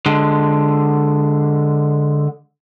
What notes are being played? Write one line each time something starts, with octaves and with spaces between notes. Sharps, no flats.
D3 G#3